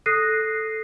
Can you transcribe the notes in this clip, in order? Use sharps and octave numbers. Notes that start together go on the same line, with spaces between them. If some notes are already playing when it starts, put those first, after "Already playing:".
A4 D#6 F#6 A#6 C7 D#7